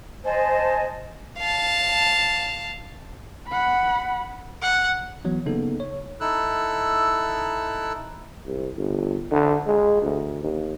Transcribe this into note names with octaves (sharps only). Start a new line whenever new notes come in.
C5 D#5 G#5 A5
F5 A5
F#5 B5
F#5
E3 F#3 B3
C#3 A#3 B3 D#4 A4
C#5
D#4 E4 A4 E6 F#6
C2
G1
D3
G#3
D2
D#2